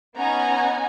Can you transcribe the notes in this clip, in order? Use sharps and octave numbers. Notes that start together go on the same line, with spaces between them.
B3 C#4 D#4 F#5 G#5 A#5